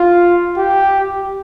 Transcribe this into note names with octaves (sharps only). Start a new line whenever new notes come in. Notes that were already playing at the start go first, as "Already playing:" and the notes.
Already playing: F4
G4